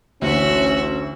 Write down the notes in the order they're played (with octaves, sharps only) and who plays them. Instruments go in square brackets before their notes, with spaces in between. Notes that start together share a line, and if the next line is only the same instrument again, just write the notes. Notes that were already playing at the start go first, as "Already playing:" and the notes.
[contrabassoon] A1 [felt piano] D2 [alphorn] C#4 [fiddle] F#4 E5